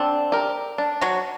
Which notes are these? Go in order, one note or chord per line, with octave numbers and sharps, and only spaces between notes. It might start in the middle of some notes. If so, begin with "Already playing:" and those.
Already playing: D3 C4 D4
G4 A#4
D4
F#3 F#4